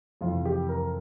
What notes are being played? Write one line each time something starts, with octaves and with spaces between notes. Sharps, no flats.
F2 C3 E3 F4
G4
A#4